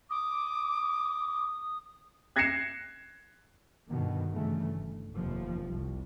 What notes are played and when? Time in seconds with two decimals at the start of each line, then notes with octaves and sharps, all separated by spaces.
0.10 D6 D#6
2.36 F#6 G#6 A#6 C7 C#7 E7
3.90 G2 B2 D3 D#3
4.33 G2 C#3 E3 A3
4.75 G1
5.14 F1 D#2 C3 F3
5.72 C2